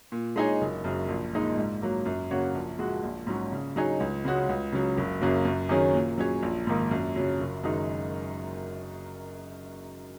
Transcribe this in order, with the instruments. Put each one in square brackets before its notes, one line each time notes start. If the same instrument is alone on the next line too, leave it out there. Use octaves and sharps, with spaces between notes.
[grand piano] A#2
G#3 D#4 G#4 C#5
F#1
F#2 C#3
A#1
A#2 G#3 D#4
G#2
F#3 A#3
F#2
C#3 A#3 F#4 C#5
A#1
A#2 G#3 F#4
A#1
G#2 F#3 C#4 F#4
C#3
F#3 D#4 G#4 C#5
C#2
C#3 G#3 C#4 F#4
C#2
C#3 F#3
F#1
F#2 C#3 F#3 A#3
F#2
D#3 F#3 C#4 G#4
A#2
F#3 C#4 G#4 C#5
A#1
G#2 D#3 A#3
F#2
C#3 F#3
F#1
F#2 D#3 G#3 D#4